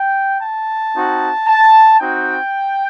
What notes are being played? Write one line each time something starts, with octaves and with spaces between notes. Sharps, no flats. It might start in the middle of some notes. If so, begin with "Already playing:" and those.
Already playing: G5
A5
C4 D#4 F#4
A5
C4 D#4 F#4 G5